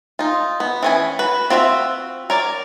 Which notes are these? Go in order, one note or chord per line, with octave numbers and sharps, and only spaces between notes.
D#4 F4
B3
E3 C#4 G#5
F#4 B4
C4 F4 F#4 D5 E5
A#4 C#5 D5